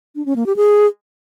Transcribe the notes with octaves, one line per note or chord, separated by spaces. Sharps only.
D4
C#4
A#3
G4
G#4